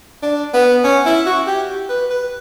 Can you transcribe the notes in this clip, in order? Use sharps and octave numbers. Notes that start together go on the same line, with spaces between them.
D4
B3
C#4
E4
F#4
G4
B4
B4